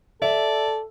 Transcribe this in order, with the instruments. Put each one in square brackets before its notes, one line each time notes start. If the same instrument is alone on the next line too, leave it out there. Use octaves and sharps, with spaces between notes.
[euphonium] A4 [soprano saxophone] D5 [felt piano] E5